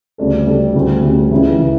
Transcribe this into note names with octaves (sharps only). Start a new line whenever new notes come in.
D2 C#3 G3 D4 A4
D2 C#3 G3 D4 A4
D2 C#3 G3
D2 C#3 G3
C#2 C#3 E3
C#3 E3